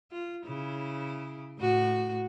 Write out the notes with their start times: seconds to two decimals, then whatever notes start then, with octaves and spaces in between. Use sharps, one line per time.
0.11 F4
0.46 C#3 E4
1.59 A2 F#4